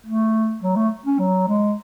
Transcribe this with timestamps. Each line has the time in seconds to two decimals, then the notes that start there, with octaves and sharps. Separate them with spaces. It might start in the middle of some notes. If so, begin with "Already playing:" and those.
0.06 A3
0.63 F#3
0.76 A3
1.06 C#4
1.19 F#3
1.48 G#3